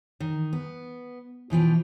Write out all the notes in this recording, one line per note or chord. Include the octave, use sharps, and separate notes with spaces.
D#3
B3
B2 E3 F3 G5